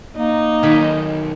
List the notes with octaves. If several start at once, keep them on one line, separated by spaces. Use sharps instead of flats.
A#3 D#4
B1 D#3 G#5 B5